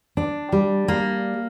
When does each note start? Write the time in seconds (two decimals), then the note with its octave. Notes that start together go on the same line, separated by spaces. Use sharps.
0.17 D4
0.52 G3
0.88 A#3